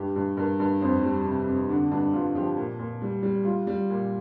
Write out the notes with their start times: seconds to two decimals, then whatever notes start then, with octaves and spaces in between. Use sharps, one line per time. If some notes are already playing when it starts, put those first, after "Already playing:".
Already playing: G2 G4
0.16 G2
0.37 G2 A#4
0.60 G2
0.81 F2 C5
1.03 G3
1.26 C3
1.47 F2
1.69 D3 D4
1.91 G2 D4
2.13 G2 F4
2.35 F3 G4
2.57 A#2
2.79 A#2
3.02 G3
3.23 G3
3.45 G3 F4
3.67 G3
3.90 A#2